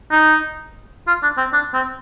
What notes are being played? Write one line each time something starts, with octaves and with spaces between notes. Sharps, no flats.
D#4
F4
D4
C4
D4
C4